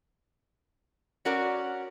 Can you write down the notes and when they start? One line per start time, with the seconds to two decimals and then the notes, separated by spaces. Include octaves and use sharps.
1.25 C#4 F#4 A#4 D5